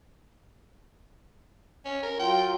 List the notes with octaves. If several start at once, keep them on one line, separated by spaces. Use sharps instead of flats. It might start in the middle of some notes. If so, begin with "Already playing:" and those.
C#4
A#4
F#3 F4 G5